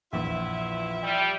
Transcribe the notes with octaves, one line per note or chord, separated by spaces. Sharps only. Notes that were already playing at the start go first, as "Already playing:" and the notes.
A#1 E2 E4 F4 E5
G3